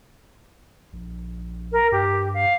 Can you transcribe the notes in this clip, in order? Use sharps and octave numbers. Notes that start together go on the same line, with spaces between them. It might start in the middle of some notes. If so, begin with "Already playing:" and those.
A#1
A#4
G2 G4
F5